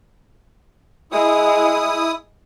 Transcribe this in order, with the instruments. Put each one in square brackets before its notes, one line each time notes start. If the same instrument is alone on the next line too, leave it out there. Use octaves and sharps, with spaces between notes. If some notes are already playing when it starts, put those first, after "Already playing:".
[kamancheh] G#3 [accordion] E4 D#6